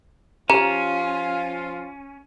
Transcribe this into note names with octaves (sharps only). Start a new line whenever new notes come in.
F3 C#4 F4 G4 A#5